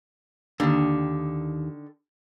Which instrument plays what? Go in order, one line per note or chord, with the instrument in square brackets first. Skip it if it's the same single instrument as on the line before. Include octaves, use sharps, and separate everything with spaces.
[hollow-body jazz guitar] D#2 [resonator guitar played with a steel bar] D3 D#3